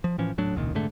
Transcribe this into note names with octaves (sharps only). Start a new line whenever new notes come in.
F3
A2 E3 F3 C#4
D#1 A2 F#3 D4
E1 C#2 A#2 D#3
F1 G#2 D3 A3